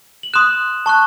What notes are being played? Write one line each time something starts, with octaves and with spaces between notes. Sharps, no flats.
F#7
C6 D#6 F#6 E7
A5 C#6 F#6